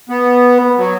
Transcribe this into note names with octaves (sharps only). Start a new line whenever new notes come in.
B3
F#3